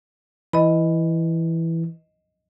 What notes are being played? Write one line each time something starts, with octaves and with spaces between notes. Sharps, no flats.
E3 D#5 B5